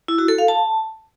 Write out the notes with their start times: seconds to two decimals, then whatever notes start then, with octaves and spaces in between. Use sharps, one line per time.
0.08 E4
0.18 F#4
0.28 A4
0.38 F5
0.48 A5